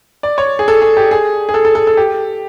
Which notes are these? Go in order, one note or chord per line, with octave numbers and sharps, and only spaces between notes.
D5
C#5
G#4
A4
G#4
G4
G#4
G#4
A4
A4
A4
A4
G4